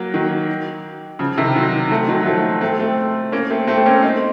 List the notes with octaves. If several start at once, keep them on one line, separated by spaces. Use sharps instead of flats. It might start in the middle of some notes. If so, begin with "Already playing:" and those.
Already playing: F#3 A#3
D#3 F#3
C#3 F3
C3 D#3
D#3 F#3
F3 A3
D#3 F#3
F#3
F3 A3
A3 C4
A3 C4
A#3 C#4
A3 C4
A3 C4
C4
A#3 C#4
C4 D#4